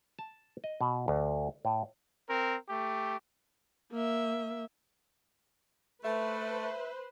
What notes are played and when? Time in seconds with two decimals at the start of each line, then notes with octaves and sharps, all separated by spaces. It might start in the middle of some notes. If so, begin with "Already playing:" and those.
0.19 A5
0.64 D#5
0.81 B2
1.08 D2
1.65 A2
2.29 C4 A#4
2.68 A3 G4
3.92 A#3 E5
6.04 A3 B4 C5 E5